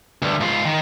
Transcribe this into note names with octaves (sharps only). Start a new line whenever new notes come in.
D2 G2
G#2 F4
D#3